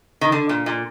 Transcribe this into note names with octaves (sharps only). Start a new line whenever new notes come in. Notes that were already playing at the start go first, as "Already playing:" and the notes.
D#3
D3
A#2
A#2